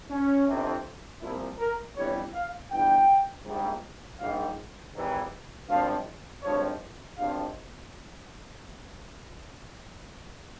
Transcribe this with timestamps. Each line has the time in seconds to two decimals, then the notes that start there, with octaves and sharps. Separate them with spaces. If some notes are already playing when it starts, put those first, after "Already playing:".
0.10 C#4
0.47 G1 F2 C3
1.21 C2 A#2 F3 E4
1.59 A#4
1.95 G1 F2 E3 G3 C#5
2.33 F5
2.70 G1 G2 E3 G3 G5
3.44 A#1 G#2 G3
4.19 A#1 G#2 G3 F5
4.93 G#1 G#2 E3 G3
5.68 G#1 G2 F3 F5
6.42 G#1 G2 F3 C#5
7.17 G#1 G2 F3 F5